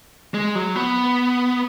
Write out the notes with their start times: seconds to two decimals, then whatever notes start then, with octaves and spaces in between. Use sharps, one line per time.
0.34 G#3
0.55 F#3
0.76 B3